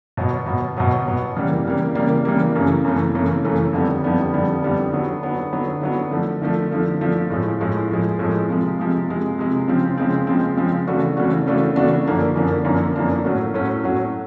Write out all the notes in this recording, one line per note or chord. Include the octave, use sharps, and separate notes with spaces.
B2 F#3 B3
B2 F#3 B3
B2 F#3 B3
B2 F#3 B3
C#3 E3 G3 A#3
C#3 E3 G3 A#3
C#3 E3 G3 A#3
C#3 E3 G3 A#3
F#2 C#3 E3 A3
F#2 C#3 E3 A3
F#2 C#3 E3 A3
F#2 C#3 E3 A3
F2 D3 G3 B3
F2 D3 G3 B3
F2 D3 G3 B3
F2 D3 G3 B3
D3 F#3 B3
D3 F#3 B3
D3 F#3 B3
D3 F#3 B3
D3 F3 A3
D3 F3 A3
D3 F3 A3
D3 F3 A3
A2 F3 G#3
A2 F3 G#3
A2 F3 G#3
A2 F3 G#3
C3 F3 G#3
C3 F3 G#3
C3 F3 G#3
C3 F3 G#3
C#3 F3 G#3 C4
C#3 F3 G#3 C4
C#3 F3 G#3 C4
C#3 F3 G#3 C4
C#3 E3 A3 D4 F#4
C#3 E3 A3 D4 F#4
C#3 E3 A3 D4 F#4
C#3 E3 A3 D4 F#4
F#2 D3 F3 A#3 D4
F#2 D3 F3 A#3 D4
F#2 D3 F3 A#3 D4
F#2 D3 F3 A#3 D4
A2 F#3 A3 C#4 F#4
A2 F#3 A3 C#4 F#4
A2 F#3 A3 C#4 F#4